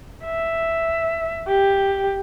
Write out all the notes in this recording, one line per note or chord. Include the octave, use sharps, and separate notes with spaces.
E5
G4